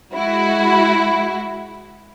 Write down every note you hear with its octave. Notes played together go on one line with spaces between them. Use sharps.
G#3 E4 F#4